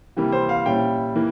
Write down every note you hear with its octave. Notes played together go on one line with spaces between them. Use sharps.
C3 E3 G3 A#3
C5
F5
A#2 G3 C#4 E4 G5
E3 A#3